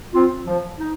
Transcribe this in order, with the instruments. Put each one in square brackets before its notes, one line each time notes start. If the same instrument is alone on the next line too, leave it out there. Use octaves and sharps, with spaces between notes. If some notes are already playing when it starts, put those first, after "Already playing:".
[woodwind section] C4 F4
F3
D#4